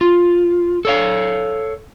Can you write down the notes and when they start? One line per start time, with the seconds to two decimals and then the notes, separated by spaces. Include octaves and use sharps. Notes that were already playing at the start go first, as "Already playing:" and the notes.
0.01 F4
0.85 A4 C#5 F5